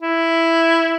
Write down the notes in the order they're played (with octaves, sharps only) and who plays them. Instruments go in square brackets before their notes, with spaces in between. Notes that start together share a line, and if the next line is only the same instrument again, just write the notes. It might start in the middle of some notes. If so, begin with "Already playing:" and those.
[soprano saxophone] E4